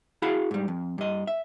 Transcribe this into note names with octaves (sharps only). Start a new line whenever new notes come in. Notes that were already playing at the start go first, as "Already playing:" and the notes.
E4 F#4 G#4 F5 A5 B5
G#2 G3
F2
G2 D#5
E5